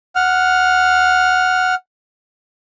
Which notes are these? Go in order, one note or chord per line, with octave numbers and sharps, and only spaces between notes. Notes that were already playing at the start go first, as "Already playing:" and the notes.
F#5 F6